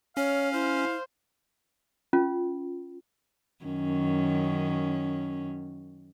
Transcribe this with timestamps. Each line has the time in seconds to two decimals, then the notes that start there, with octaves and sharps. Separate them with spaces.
0.17 C#4 C#5 F5
0.53 E4 C5
2.13 C#4 F4
3.65 F#2 D#3 C#4